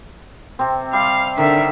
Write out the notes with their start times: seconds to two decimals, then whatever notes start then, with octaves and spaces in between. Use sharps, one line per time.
0.59 C3 C4
0.93 G3 F5
1.38 D3 D#3 E5